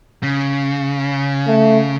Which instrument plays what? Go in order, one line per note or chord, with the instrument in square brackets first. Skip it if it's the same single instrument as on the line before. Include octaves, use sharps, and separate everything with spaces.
[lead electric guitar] C#3
[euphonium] A3